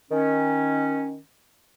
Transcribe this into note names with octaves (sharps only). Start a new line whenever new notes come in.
D#3 C#4